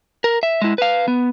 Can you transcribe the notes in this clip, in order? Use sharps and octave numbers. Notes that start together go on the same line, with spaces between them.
A#4
E5
G#3 E4
B4 F5
B3